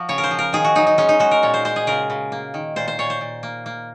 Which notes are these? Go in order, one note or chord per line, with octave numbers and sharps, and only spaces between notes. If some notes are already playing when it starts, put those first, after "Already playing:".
Already playing: F3 F#4
C#3 C#5
A#4
C5
F3
A#4
D#3 G#4
F#4
F#3 D#4
D#4
G#3 C#4
D#4
G#3 F#4
A#4
A#2 C#5
C5
G#3 C5
G#4
C#3 A#4
C#3
A#3
D#3
A#2 C5
C5
A#2 C#5
C5
A#2
A#3
A#3